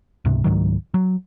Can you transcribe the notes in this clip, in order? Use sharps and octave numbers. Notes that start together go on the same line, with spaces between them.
C#2 G#2 C3
C#2 G#2 D#3 F#3
F#3